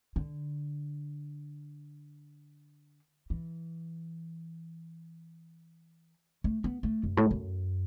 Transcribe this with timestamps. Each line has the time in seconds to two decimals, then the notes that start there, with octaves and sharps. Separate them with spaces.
0.16 D3
3.30 E3
6.44 A3
6.64 B3
6.83 A3
7.03 F#2
7.17 A2
7.31 F#2